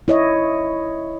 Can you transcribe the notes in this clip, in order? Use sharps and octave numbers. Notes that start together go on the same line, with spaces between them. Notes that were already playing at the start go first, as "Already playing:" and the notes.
E4 C#5 D#5